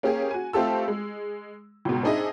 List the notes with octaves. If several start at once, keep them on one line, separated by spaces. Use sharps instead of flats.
A#3 C#4 G4 G#4
F#4 G#5
A3 C4 F4 G4 A4 E6
G#3
C#2 G#2 B2
C4 D4 D#4 G#4 D#5 E5